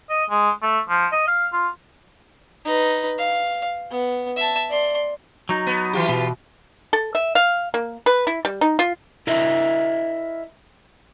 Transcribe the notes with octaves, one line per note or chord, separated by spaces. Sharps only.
D#5
G#3
A3
F3
D#5
F5
F4
D#4 B4
F5
B3
E5 A5
D5 C6
F#3 D#4
B3
E3 F4 G4
B2
A4
E5
F5
A#3
B4
E4
G3
D#4
F4
E4 A#4 D#5 E5